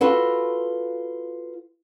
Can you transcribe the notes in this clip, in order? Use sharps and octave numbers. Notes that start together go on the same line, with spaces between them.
F4 F#4 A4 B4 F#5